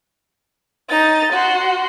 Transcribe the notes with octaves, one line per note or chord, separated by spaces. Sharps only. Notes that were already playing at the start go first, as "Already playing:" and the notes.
D#4 A6
F#4 C6